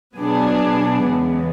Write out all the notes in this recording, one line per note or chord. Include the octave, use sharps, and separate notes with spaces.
B2 F#3 B3 D4 G#4
E2 C#3 G#3 B3